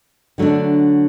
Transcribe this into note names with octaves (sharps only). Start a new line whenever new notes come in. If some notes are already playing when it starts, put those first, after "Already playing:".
D3 F#3 A3 D4